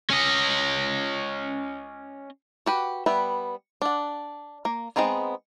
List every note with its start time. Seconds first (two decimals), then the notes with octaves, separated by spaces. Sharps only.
0.10 C#4 D#5
2.66 F#4 G4 B4
3.06 G3 B3 B4 E5 G5
3.82 D4 F#5
4.65 A#3
4.96 G#3 B3 C4 D#4 G#4